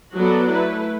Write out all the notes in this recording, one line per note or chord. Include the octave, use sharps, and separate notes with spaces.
F#3 B3 F#4 A4 D5
A3 E4 B4